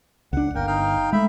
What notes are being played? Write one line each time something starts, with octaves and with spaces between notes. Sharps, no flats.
C#2 D4 F#5
G1 A#3 A#4 G5
D#4 F5 G5
G#3 A3 E5 B5